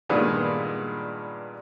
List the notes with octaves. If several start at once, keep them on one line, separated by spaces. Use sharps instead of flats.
G2 A#2 D#3 G#3 B3 D4